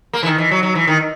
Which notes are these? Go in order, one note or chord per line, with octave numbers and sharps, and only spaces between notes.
A#3
E3
D#3
E3
F#3
F#3
E3
D#3